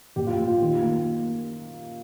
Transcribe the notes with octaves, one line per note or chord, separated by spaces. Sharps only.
A#2 G4
F4
A#3
F4
D#3
A#3